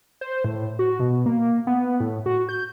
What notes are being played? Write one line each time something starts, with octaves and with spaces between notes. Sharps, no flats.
C5
A2
F#4
B2
A#3
B3
A2
F#4
G6